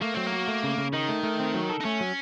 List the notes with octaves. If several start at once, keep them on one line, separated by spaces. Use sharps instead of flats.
A3 A#3
F#3 C4
A#3
F#4
A3
C#3
C#3
D#3 D#4
A3
A3
C4
F#3
A4
D#4
A3 C#4
F#3